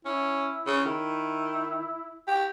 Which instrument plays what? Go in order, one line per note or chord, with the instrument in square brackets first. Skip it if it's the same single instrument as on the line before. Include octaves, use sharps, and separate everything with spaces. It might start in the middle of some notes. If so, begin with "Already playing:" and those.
[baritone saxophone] C#4 [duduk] E4
[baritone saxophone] C#3
[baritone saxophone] D#3 [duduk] E4
[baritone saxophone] G4